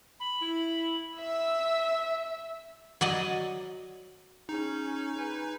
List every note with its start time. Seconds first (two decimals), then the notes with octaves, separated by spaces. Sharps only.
0.20 B5
0.40 E4
1.17 E5 E6
3.01 F#3 D5 D#5
4.49 C#4 D#4 G#4
5.17 B4 G#5